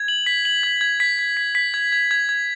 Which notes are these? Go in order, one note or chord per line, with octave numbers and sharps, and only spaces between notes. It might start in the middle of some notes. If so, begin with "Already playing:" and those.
Already playing: G#6
F#7
B6
F#7
G#6
G#6
B6
B6
B6
B6
G#6
G#6
G#6
G#6